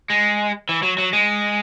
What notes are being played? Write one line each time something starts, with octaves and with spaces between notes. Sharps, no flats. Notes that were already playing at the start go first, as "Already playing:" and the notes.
G#3
E3
F#3
F#3
G#3